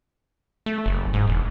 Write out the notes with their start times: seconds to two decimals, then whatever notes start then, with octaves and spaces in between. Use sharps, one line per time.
0.66 A3
0.86 F#1
1.13 G#2
1.28 E1